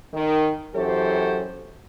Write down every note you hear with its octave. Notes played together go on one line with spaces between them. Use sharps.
D#3
F#2 E3 F#3 G4 A4 C5